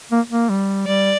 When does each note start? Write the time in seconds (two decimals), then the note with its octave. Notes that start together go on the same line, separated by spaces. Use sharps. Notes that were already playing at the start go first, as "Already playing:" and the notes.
0.12 A#3
0.30 A#3
0.49 G3
0.87 G3 D5